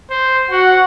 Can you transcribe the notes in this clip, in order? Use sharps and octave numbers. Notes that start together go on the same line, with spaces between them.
C5
F#4 F#5